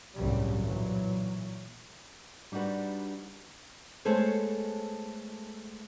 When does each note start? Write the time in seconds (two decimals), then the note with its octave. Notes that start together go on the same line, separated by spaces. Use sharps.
0.15 G1 C2 A2 C#3 F#3 G3
0.63 A#2 E3 F#3
2.52 G3 D4 D#4 F#4 B4
4.05 G#3 A3 B3 A4 C5 C#5